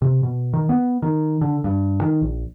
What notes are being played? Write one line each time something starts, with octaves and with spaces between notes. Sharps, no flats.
C3
B2
D#3
B3
D#3
D3
G2
D#3
A#1